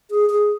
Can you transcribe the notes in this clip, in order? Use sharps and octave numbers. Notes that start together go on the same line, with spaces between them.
G#4
G#4